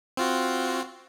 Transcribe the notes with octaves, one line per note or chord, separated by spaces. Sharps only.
C4 F4 F#4